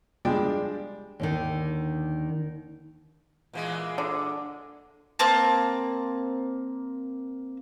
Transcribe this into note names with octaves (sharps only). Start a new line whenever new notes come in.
F3 G3 G#3 D4 D5 G5
D#2 D3 D#3
A#2 E3 G#3
D3
A#3 C4 A5